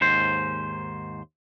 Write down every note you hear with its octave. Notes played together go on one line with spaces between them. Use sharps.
D#2 G#2 C5